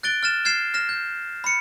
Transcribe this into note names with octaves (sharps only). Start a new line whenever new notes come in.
F#6 A6 D7 G7
F6 A6 E7
F6 G#6 C7 E7
F6 A#6 E7
G6
B5 C#7